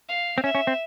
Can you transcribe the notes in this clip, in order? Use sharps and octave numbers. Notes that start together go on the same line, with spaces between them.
F5
C4
C#4 E5
C#4
C4